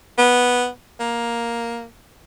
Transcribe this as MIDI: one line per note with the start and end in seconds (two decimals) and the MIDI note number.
0.18 0.68 59
1.00 1.85 58